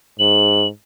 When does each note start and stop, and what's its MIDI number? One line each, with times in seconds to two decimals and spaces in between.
0.19 0.68 44
0.19 0.67 102